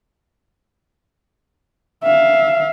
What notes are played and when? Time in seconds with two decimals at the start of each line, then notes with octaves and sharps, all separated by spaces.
2.04 E5 F5